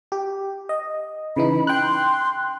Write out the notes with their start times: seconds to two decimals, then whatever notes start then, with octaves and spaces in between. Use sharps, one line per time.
0.12 G4
0.69 D#5
1.36 C#3 E3 D#4 B5
1.67 G5 C6 F#6